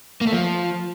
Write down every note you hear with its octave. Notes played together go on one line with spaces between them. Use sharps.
A#3
A3
F3